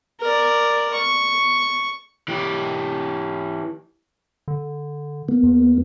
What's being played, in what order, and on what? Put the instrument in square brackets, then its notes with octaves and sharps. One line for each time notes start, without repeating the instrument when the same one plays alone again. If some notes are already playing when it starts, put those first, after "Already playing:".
[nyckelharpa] A#4 D5
C#6
[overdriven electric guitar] E3 G4
[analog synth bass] D3
[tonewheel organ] A#3 B3
[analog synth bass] E2